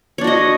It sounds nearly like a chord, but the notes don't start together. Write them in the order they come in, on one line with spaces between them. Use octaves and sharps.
C#5 D4 F#4 D#5